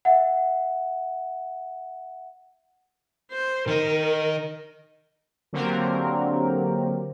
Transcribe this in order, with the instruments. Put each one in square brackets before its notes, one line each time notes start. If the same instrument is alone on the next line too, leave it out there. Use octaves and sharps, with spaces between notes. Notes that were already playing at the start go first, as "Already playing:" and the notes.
[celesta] E5 F#5
[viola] C5
[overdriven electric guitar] D#3 D#4 [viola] A#4
[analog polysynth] D3 F#3 A#3 C4 G4 A#4